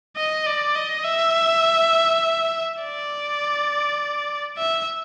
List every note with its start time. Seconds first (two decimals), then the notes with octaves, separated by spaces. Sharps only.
0.16 D#5
0.46 D5
0.75 D#5
1.04 E5
2.81 D5
4.58 E5